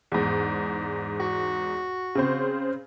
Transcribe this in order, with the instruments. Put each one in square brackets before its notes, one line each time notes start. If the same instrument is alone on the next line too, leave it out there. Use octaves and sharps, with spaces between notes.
[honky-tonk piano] E2 G#2
[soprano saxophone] F#4
[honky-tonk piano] C#3 C4 C5